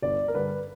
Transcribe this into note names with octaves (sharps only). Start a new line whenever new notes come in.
G1 D5
A#4
G2 D3 B4